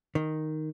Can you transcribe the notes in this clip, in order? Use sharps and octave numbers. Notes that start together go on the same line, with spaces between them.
D#3